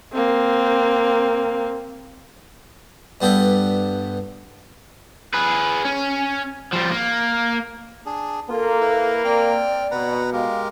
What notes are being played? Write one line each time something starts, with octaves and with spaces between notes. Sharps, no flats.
A#3 C4
G2 B3 G4 A4
G#4 B4
C#4
F3 G3
A#3
D4 G#4
A#3 F4 A4
E4 B4
C4 D5 G5 F6
B2 B4 F#5 A#5
G#3 G4 A#4 F5